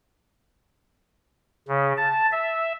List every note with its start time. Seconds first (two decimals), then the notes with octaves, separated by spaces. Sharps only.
1.68 C#3
1.97 A5
2.32 E5